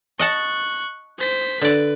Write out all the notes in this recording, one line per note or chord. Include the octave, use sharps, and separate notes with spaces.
D#5 F#5 A5 C#6 F#6
C5 B6
D3 B4 D5